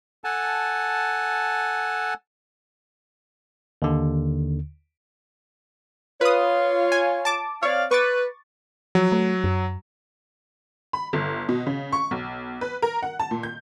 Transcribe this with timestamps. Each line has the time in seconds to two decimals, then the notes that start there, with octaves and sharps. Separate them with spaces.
0.24 A4 F#5 G#5 A5
3.82 D#2 D3
6.21 F4 B4 C#5 D#6
6.92 G#5
7.25 A5 D6
7.63 C4 C#5 D5 F5
7.91 B4 C#6 D6 A6
8.95 F3 F#3
9.12 A3
9.44 F#2
10.93 B5
11.13 G1
11.49 B2
11.67 C#3
11.92 C#6
12.11 B1
12.61 B4
12.82 A#4
13.03 F#5
13.19 A5
13.31 A#2
13.43 G6